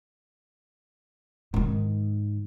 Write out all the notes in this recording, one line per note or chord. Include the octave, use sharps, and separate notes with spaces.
G#2 D#3